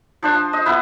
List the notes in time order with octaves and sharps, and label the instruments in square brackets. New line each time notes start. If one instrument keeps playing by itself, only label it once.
[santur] F3 D4 C5
F3
D#5
B3 E4 B4